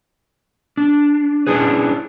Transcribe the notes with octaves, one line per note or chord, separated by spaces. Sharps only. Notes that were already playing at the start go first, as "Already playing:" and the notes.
D4
C#4 D4 E4 G#4 B4